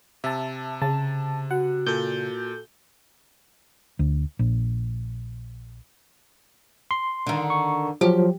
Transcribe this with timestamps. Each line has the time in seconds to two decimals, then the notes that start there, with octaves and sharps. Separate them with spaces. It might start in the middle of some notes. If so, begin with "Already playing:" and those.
0.24 C3 E5 A5
0.82 C#3 A5
1.51 F#4 F#5
1.86 A#2 A4 G6
3.99 D2
4.39 A#1
6.91 C6
7.27 D3 D#3
7.50 C#6
8.01 F3 F#3 G4